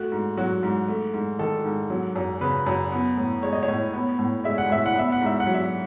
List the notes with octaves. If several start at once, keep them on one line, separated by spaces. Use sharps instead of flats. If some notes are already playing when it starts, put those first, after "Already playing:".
Already playing: A3 F#4
G#2
F#3 F#4
G#2
A3
G#2
D#3 A4
G#2
F#3
F#2
C#3 B4
F#2
B3
A2
G#3 C#5
D#5
C#5
A2
B3
A2
G#3 E5
F#5
A2 E5
F#5
B3 E5
F#5
G#2 E5
F#5
F#3
E5